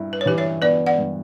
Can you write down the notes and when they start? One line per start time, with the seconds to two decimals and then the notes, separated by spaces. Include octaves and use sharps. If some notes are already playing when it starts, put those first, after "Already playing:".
Already playing: G2 E4
0.13 B4
0.21 C#5
0.26 E3 G4 B4
0.38 C#5 E5
0.62 B3 B4 D5
0.86 D5 F#5
0.98 G2